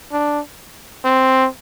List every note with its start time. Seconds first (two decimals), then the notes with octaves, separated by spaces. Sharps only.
0.12 D4
1.04 C4